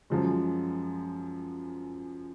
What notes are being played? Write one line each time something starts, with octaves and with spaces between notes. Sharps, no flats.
F#2 F3 G#3